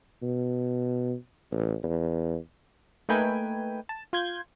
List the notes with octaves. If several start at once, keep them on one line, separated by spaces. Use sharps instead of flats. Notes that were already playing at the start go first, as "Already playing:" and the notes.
B2
A1
E2
A3 A#3 D#4 B4 G5 G#5
A5
F4 G6 G#6